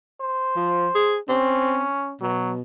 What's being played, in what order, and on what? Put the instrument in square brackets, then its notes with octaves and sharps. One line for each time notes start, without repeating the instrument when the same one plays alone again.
[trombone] C5
[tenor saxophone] F3
G#4
[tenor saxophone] C4 [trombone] C#4
[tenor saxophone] B2 [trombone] F#3